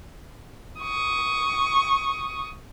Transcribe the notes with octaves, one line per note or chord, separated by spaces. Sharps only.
C#6 D#6